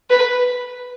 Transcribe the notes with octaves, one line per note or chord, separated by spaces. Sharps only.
B4